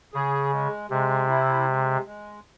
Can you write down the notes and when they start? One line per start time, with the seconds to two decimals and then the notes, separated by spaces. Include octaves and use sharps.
0.14 C#3 G#4
0.52 G#3
0.90 C3 G#3
1.29 E4
1.67 G#3
2.05 G#3